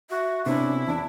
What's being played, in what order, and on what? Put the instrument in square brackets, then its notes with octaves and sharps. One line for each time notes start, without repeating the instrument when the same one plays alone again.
[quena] F#4 [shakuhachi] E5
[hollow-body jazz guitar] C3 B3 C#4 [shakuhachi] D4 [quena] E4
[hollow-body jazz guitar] E2 D4 [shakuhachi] A5